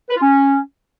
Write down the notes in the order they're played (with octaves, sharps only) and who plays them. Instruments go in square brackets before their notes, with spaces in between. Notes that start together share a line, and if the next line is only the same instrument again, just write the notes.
[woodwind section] B4
F4
C#4